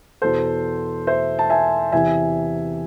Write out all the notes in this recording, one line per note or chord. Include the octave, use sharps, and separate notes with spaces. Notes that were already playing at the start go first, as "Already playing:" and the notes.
E2 B2 A4 C5
C5 E5
A5
E5 G#5
E2 C3 E3 E5 G#5